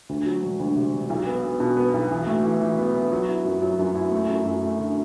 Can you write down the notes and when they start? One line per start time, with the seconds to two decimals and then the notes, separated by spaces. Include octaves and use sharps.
0.09 D2
0.26 F#3
0.42 E1
0.59 D2
0.76 C3
0.93 E1
1.10 B1
1.26 B3
1.44 B3
1.60 B2
1.77 B3
1.94 B1
2.11 E3
2.27 A2
2.44 E3
2.61 E3
2.78 B3
2.95 B3
3.12 F#3
3.29 E4
3.45 F#2
3.62 F#3
3.79 F#2
3.95 E4
4.12 A3
4.29 F#2
4.45 F#2
4.63 A3
4.79 D3